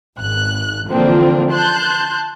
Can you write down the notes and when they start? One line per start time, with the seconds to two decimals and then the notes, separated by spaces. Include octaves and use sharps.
0.19 G#1 F#6
0.88 D3 E3 F3 A#3 C4 D4
1.51 A5 C6 F#6 G6